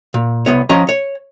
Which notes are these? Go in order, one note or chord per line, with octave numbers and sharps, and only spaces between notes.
A#2
C2 B3 C#5
F3 C#4 D#5 A#5
C#5